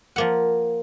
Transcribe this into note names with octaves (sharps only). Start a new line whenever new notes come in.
F3 A#3 F#5